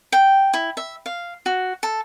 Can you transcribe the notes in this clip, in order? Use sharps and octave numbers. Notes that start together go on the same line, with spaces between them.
G5
E4
E5
F5
F#4
A4